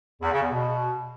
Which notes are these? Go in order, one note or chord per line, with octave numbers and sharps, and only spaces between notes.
E2
C#3
E2
B2